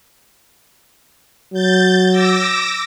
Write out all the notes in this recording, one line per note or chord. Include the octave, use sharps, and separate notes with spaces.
F#3 G6 A6
D6 E6 A#6